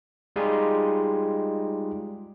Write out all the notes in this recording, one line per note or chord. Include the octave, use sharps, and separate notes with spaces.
G3 G#3 D#4 F4 G4 G#4